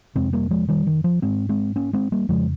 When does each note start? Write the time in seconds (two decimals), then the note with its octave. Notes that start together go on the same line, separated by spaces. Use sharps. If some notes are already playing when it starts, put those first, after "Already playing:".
0.15 F2 C3 G#3 C4
0.33 G3 A#3
0.51 F3 G#3
0.68 D#3 G3
0.87 D#3
1.04 F3
1.22 G#2 G#3 C4
1.49 G#3 C4
1.76 A#3 C#4
1.93 G#3 C4
2.12 G3 A#3
2.29 F2 C#3 F3 G#3